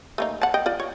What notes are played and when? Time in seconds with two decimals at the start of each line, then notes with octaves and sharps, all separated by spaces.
0.18 A3 A#3 D#4
0.42 F#5 A5
0.54 D#5 G5
0.66 F4 D5
0.80 C#5